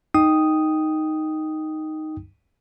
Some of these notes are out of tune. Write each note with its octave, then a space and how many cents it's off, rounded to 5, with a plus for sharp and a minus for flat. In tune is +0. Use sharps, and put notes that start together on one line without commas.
D#4 +0 G5 +0 D#6 +0